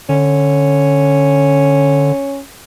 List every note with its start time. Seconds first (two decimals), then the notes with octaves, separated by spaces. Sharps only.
0.09 D3 C#4